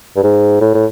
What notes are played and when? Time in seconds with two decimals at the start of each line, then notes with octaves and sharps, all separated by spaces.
0.16 G2
0.23 G#2
0.61 A2
0.74 A2